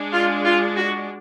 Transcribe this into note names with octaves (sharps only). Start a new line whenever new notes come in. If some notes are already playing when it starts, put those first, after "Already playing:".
Already playing: G#3 D4
F4
F4
F#4